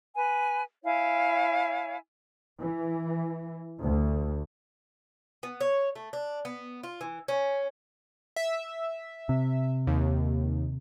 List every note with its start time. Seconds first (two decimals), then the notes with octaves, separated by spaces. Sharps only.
0.15 B4 G#5
0.84 E4 C#5 F5 G#5
2.60 E3
3.80 D2
5.43 B3
5.61 C#5
5.96 A3
6.13 D4
6.45 B3
6.83 F4
7.01 E3
7.28 C#4
8.36 E5
9.29 C3
9.87 D#2